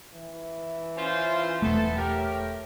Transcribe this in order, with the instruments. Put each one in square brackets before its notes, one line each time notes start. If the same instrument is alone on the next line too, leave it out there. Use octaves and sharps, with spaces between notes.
[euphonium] E3
[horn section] C#4 F4 C5
[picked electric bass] E1 A3 [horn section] B3 A4
[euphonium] A2 [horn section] G4 A#4